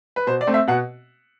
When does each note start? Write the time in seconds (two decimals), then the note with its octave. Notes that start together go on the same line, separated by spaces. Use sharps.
0.16 B4
0.27 B2 C5
0.41 D5
0.47 A3 C4
0.54 E5
0.67 B2 F#5